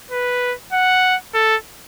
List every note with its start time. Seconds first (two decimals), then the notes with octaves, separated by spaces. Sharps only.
0.11 B4
0.73 F#5
1.34 A4